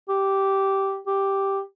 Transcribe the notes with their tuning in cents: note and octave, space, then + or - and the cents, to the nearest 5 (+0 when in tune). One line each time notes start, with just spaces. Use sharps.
G4 -10
G4 +0